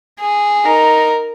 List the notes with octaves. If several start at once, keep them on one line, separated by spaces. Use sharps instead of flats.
G#4
D#4 A#4